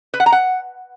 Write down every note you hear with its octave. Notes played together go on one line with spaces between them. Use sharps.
B4
F#5
A#5
F#5